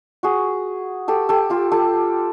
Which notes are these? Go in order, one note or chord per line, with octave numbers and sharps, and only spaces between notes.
F#4 G#4
G4 A4
G4 A4
F4 G4
G4 A4